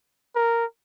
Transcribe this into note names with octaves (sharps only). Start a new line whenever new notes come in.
A#4